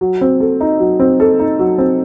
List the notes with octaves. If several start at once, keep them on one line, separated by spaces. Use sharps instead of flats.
F#3
C4
A4
D#4
F#3
C4
A4
D#4
F#3
C4